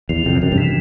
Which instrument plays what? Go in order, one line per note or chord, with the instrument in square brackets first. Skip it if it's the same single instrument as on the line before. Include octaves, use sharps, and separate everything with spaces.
[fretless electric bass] E2 [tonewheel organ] F3
[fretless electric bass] F2 [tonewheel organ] C3
[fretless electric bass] F#2 [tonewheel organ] C3
[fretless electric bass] G2
[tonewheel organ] E3